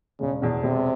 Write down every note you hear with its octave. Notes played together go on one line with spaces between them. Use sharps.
E1 C#3
E2 B2
E1 C3